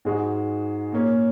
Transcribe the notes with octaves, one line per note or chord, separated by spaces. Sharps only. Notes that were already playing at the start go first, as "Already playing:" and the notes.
G#2 G#3 F#4
A#2 A#3 C#4